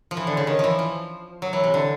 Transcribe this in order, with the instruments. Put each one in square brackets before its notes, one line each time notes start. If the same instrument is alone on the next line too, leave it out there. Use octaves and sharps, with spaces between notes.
[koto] F3
E3
D3
C#3
D#3
E3 F3
F3
F#3
E3
C3
D3